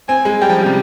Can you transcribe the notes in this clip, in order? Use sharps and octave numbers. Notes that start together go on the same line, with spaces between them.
C4 G#5
G#3
G3 G5
F3
C#3
C3